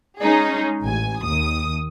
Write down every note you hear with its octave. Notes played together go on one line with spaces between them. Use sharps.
G#3 C#4 D#4 G#4
A1 G#5
D#2 D#6